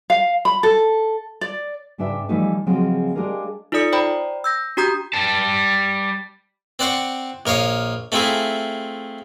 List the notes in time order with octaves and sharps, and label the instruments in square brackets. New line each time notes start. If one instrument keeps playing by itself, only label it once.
[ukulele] F5
B5
A4
D5
[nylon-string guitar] G#2 C#3 D4 B4 E5 G5
E3 F3 G3 A3 D#4
C#3 F3 F#3 G#3 C4 C#4
G#3 D4 G4 G#4 A#4 F5
[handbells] D#4 F4 A4 D5 D#6 C#7
C5 D5 G5 A#5 B5
E6 G6 A#6
D4 F#4 G4 A#5 D#6 G6
[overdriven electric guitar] G3 A5
[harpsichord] C4 D5 F#5 C6 C#6
A#1 A#4 C#5 F5 D#6
A3 C4 E4 F4 G#4